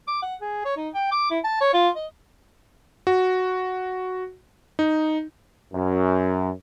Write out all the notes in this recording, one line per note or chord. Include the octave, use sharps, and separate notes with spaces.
D6
F#5
G#4
C#5
D#4
G5
D6
E4
A5
C#5
F4
D#5
F#4
D#4
F#2